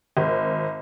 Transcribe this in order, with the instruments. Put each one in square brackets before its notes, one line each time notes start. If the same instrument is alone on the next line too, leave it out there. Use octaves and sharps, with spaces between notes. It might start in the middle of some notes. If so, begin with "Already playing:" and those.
[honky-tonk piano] G#1